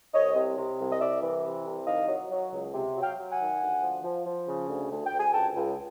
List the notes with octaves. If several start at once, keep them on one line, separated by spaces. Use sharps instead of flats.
C2 C#5 D#5
C3
C3
C2
D#5
C2 D5 E5
E3
C3
C2
D#3 D#5 F5
F#3
F#3
C#2
C3
F#3
F5 G5
F#3
F#5 G#5
D#3
D2
F3
F3
F3
C#3
D2
D2
G5
D2
G#5
C#2 G5 A5
C#2